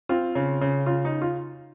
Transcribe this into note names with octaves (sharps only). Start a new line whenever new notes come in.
C4 F4
C#3
C#3
C#3 F4
D#4
F4